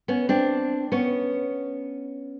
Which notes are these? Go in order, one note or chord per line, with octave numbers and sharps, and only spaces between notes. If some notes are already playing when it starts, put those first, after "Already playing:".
B3 C#4
C4 D4
B3 C#4